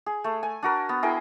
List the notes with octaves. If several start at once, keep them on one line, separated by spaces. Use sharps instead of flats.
G#4
A3
G#5
D4 F#4 A#4
B3
E4 G#4 A#4 G5